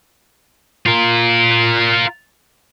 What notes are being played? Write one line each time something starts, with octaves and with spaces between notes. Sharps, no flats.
F4 A#4